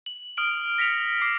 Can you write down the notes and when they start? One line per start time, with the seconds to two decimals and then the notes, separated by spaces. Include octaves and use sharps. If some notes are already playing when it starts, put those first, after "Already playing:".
0.06 F#7
0.37 D#6 F6 D7 F#7
0.78 A#6 B6 C#7 F7
1.21 D6 C7